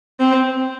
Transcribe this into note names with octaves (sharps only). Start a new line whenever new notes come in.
C4